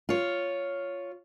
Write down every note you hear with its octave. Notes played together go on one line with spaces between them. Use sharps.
F4 C#5